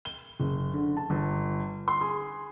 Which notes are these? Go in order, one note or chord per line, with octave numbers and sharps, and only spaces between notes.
G7
F#1
D3
A5
G1
C6
G#4